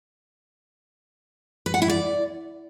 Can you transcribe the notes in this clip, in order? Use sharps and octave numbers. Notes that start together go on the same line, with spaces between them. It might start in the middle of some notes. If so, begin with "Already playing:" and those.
B4
F#5
E4
D5